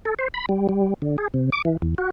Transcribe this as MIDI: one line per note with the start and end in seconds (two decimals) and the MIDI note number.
0.05 0.14 69
0.19 0.28 72
0.34 0.46 83
0.49 0.67 55
0.69 0.94 55
1.02 1.17 50
1.18 1.28 68
1.34 1.50 48
1.52 1.62 86
1.65 1.77 52
1.82 1.95 40
1.98 2.10 66